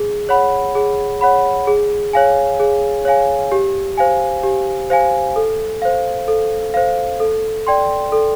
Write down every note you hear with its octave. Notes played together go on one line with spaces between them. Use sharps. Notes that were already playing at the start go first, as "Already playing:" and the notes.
Already playing: G#4
C#5 F#5 B5
G#4
C#5 F#5 B5
G#4
C#5 F5 G#5
G#4
C#5 F5 G#5
G4
C5 F5 G#5
G4
C5 F5 G#5
A4
C5 F5
A4
C5 F5
A4
D5 G5 C6
A4